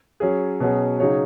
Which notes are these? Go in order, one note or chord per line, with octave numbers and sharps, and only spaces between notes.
F#3 C#4 G#4
B2 F#3 C#4 G#4
C#3 F#3 D#4 G#4 C#5